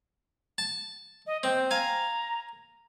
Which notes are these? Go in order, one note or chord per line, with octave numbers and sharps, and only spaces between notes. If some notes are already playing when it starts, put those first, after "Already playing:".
A5
D#5
C4 G5
F5 G#5 A#5